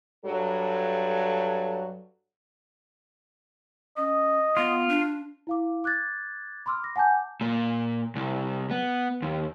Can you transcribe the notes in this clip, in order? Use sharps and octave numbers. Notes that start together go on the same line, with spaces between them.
G2 F#3 A4
C#4 D#5
B3 F4
D4
E4 F5 D6
D6 F#6 G#6 A6
B5 C6 D6 E6 F6
A#6
F#5 G#5 A5 D6 G6
A#2
C2
B3
D#2